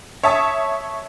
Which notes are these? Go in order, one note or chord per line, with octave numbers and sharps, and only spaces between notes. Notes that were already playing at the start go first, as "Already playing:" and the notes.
C#5 E5 A5 D#6